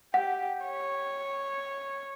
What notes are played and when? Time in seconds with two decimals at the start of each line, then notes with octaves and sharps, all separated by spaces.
0.14 G4 F#5
0.65 C#5